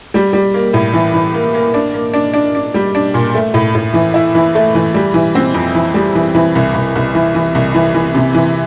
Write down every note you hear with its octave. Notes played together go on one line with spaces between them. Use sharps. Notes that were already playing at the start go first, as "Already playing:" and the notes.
G3
G3
A#3
A2
E3
E3
A#3
A#3
D4
A#3
D4
D4
D4
G3
D4
A#2
A3
A2
A2
E3
E4
E3
A3
E3
G3
E3
C4
F2
E3
G3
E3
E3
C2
C2
C2
E3
E3
C2
E3
E3
C3
E3